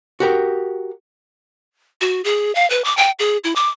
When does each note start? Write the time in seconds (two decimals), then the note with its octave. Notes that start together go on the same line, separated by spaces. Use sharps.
0.20 F#4 G4 A#4
2.01 F#4
2.24 G#4
2.55 F5
2.70 B4
2.84 D6
2.97 G5
3.19 G#4
3.44 E4
3.56 D6